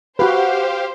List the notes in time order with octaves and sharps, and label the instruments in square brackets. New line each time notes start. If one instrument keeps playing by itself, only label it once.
[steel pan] F#4 B4 [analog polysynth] G4 F5 [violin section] C5 [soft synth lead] F#5